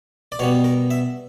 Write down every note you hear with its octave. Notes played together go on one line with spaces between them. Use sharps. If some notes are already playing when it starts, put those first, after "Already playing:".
D5
B2 G3 B3 C#5
A#4
E5